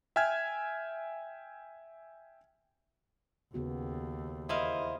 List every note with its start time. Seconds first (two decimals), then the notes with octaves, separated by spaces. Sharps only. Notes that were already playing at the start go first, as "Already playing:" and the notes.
0.16 E5 G5 G#5 F6 G#6
3.54 D#2 C#3 B3 F#4
4.49 E2 E4 A#4 C5 D#5 F5